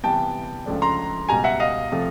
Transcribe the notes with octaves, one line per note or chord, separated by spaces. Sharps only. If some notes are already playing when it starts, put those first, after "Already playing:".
C3 E3 G3 B3 G5 A5
C#2 C#3 F3 A3 D4
A#5 C6
C#2 B2 G3 G#5 A#5
E5 F#5
D#5 F5
C3 F3 A3